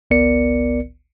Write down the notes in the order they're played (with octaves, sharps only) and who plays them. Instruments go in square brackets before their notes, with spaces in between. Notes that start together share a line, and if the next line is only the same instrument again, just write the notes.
[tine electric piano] G1 C#2 B3 A#4 D5 C#7